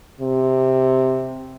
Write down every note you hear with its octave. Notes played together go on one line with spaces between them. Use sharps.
C3